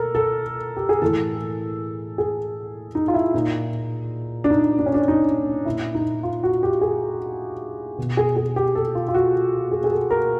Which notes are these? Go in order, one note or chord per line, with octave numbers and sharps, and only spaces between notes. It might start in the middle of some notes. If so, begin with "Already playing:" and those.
Already playing: B2 A4 A#4
A4
G4
G#4
A2 E3 A4
G#4
D#4
F4
E4
A#2 D#4
D4
D#4
D4
C#4
D4
D#4
A#2 E4
D#4
F4
F#4
G4
G#4
B2
G#4
G#4
G4
A4
F4
F4
F#4
G#4
G#4
A4
A#4